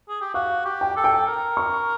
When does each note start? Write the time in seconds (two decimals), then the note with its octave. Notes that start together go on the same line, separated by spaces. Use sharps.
0.09 G#4
0.21 G4
0.34 F#4 F5
0.65 G4
0.81 G5
0.96 A4
1.04 G5
1.26 A#4
1.57 C#6